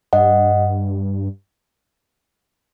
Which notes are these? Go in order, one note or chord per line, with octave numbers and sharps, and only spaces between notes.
G2 D#5 F#5